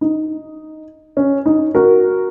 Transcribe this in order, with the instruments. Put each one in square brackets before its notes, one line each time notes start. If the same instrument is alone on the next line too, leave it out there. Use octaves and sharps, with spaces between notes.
[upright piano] D#4
C#4
D#4
F#4 A#4